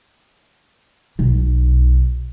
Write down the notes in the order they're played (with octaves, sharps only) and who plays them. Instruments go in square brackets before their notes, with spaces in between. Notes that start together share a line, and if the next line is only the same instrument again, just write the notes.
[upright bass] B1